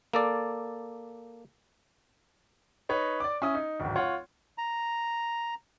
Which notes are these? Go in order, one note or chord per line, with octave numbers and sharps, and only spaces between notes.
A#3 A4 D5
D#4 B4 C#5 D#5
D5 D6
C#4 E4 D#6
D#4
D1 G#1
F4 C#5 F#5
A#5